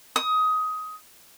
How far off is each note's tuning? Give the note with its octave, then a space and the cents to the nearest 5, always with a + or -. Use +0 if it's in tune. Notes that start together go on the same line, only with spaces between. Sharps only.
D#6 +15